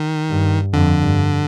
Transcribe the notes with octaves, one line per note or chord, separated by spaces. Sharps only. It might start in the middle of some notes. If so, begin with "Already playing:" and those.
Already playing: D#3
G2
F2 D3
G2